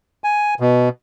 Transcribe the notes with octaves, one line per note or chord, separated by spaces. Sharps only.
G#5
B2